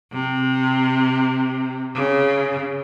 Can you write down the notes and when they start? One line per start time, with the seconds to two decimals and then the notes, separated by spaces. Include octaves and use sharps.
0.13 C3
1.96 C#3